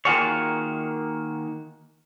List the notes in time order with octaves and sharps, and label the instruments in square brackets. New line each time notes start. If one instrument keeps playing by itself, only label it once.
[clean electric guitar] D#3 A#3 F4 F#4 G#4 C#5